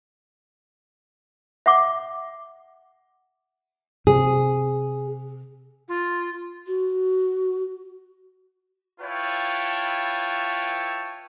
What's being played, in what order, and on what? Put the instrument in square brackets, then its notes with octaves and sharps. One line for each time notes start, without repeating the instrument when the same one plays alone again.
[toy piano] E5 F#5 D6
[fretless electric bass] C3 [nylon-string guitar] G#4
[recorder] F4
[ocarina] F#4
[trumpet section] E4 F4 B4 C#5 G5 A5